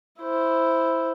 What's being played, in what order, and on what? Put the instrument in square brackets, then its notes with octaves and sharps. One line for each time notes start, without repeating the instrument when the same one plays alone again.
[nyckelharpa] E4 C5